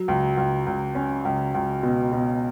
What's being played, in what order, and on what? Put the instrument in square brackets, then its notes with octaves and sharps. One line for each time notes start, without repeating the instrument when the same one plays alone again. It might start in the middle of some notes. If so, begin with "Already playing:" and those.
Already playing: [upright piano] F#3
C#2
C#2
C#2
C#4
C#2
C#2
B2
B2